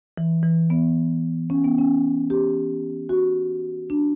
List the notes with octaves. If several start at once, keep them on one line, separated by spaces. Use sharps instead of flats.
E3
E3
B3
C#4
B3
C#4
G4
F#4
D4